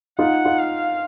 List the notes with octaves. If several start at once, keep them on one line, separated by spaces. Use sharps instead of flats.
D#4 F4 F#5
D#4 F4
F5